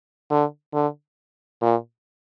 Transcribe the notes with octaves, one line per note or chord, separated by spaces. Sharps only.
D3
D3
A#2